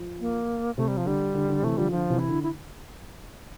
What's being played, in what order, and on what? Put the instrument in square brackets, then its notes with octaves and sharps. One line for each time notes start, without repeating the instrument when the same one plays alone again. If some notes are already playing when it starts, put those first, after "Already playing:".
Already playing: [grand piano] F3
[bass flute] A#3
[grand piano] C3 [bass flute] A3
[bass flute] G3
F3
[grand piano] D3 [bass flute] G3
[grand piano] D3
D3
[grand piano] C3 E3 [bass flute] A3
[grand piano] D3 F3 [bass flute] G3
[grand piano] D3 [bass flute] F3
[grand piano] C3 E3
[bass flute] E4
[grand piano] D3
[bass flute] E4